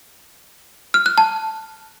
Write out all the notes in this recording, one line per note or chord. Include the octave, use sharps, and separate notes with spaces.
F6
F#6
A5